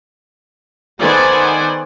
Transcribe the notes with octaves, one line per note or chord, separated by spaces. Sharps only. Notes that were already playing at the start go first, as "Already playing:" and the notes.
D#3 B3 A4 C5 D5 G#5